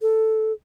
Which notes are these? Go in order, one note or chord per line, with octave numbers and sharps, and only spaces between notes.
A4